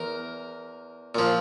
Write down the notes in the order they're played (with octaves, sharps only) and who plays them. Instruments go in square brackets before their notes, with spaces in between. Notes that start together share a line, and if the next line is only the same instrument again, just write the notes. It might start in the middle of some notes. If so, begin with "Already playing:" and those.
Already playing: [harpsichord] E2 A#4
A#2 F3